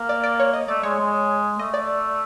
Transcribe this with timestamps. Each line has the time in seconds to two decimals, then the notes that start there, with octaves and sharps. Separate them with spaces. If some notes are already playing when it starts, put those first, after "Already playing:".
Already playing: A#3
0.09 D5
0.24 D5
0.40 C#5
0.53 D#5
0.68 A3 D5
0.83 G#3 C#5
0.99 G#3
1.59 A3 D#5
1.74 D5